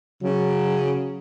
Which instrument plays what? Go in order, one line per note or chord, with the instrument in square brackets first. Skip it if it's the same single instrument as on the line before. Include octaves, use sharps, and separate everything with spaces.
[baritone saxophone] C#3 [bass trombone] F#3